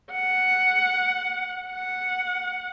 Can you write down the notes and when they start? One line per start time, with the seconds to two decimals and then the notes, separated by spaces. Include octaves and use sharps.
0.12 F#5
1.68 F#5